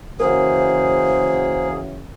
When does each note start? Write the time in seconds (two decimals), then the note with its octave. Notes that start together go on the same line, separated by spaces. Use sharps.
0.20 C#3 E3 A#3 F#4 G#4 A#4 C5